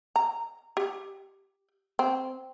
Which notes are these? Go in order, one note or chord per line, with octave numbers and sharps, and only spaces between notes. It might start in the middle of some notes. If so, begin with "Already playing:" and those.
A#5
G4
C4